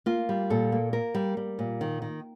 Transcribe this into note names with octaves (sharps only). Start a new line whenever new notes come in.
A#3 F4
G3
A#2 A4
A#3
A#3 A#4
G3
G3
A#2
D#3
D#3